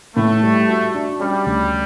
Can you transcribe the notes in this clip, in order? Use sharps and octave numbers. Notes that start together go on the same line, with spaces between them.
A2 A3
G3
F#4
D4
G3 C#4
D2